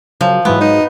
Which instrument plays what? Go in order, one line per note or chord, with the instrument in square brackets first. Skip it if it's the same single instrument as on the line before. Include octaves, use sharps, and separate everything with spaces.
[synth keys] C#3 F#3 A#3 [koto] F3
[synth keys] G#2 F#3 G#3 [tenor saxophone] E3 [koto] B3
[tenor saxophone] D#4